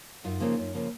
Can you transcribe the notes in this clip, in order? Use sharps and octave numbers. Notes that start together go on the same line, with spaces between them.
F#2 D#4 F4
C#3 F3 A#3
F#2
C#3 F3 A#3